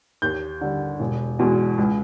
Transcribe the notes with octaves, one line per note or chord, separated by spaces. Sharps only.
D#2 G6
D3 G3
E1
E2 B2 G#3
C#2